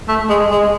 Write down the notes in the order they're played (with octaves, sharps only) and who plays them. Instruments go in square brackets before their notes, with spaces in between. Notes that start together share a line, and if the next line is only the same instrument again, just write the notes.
[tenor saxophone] A3
G#3
G#3